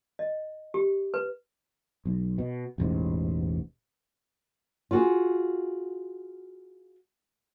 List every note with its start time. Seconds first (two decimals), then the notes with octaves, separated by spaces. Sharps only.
0.19 D#5
0.74 G4
1.14 B4
2.05 B1
2.38 B2
2.78 E1 A1 G#2
4.91 F4 F#4 G#4